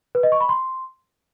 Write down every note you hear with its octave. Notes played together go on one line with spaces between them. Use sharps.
B4
D#5
C#6
B5
C6